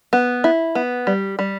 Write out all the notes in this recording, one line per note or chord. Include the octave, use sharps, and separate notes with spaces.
B3
E4
B3
G3
G3